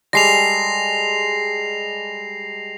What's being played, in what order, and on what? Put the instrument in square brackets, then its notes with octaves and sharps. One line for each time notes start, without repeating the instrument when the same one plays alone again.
[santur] G3 G#3 A4 [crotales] A#6 C7 F7